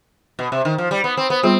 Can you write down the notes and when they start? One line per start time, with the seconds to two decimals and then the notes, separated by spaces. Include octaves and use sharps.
0.39 B2
0.52 C3
0.65 D#3
0.78 F3
0.91 G3
1.04 B3
1.17 C4
1.30 B3
1.43 G3 B3 C4 F4 G#4